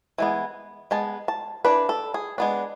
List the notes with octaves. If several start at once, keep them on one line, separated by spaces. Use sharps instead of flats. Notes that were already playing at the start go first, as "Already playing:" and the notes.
E3 G#3 B3
G#3 B3 A5
A5
E3 A3 D4 B4
A4
G#4
G#3 B3 D4